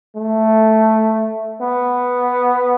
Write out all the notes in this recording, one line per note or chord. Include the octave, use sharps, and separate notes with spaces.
A3
B3